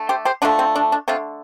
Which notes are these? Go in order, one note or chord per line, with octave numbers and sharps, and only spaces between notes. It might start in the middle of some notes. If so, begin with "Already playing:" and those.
Already playing: D3 A3
G4 C5
G4 C5
D3 F3 A3 D4
C4
D4
D4
D3 A3 C4 F4